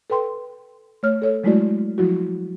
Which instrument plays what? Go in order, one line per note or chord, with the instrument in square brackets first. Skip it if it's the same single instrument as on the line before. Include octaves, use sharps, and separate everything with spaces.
[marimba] A4 B4 G5 C6
A3 C#5 F6
A4 C#5
F#3 G#3 A3 E4 F#4 D5
F3 F#3 E4 F#4